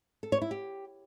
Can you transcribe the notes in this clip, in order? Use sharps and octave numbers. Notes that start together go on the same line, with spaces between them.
A4
C#5
E4
G4